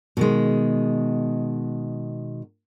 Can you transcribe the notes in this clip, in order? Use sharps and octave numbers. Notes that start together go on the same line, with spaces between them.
B2 D#3 G#3